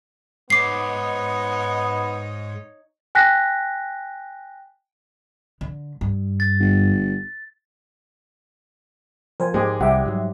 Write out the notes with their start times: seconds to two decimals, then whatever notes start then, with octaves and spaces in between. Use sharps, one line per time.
0.50 G#2 B3 D#4 C#5 D6 C7
3.15 G5 G#5 F#6 A#6 B6
5.61 D3
6.01 G2
6.40 A6
6.60 G1
9.40 F3 A#4 C5 G#5
9.54 G#2 G#3 G4
9.81 C2 G3 G4 E5 F#5
10.06 G#2 F#3